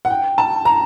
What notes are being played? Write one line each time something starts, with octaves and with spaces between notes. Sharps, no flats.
F#5
G5
A5
A#5